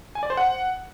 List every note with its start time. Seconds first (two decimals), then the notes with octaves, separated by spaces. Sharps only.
0.15 G#5
0.23 D5
0.30 C5
0.37 F#5